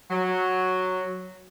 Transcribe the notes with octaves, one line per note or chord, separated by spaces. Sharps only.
F#3